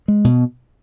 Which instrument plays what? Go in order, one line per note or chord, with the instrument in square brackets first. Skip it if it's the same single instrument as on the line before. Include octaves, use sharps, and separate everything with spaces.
[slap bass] G#3
B2